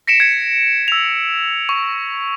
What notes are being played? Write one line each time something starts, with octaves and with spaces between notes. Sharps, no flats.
A#6 B6 C#7 D7 E7
G#6 C#7
E6 F7
C#6